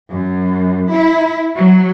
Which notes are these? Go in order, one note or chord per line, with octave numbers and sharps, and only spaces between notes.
F#2
E4
F#3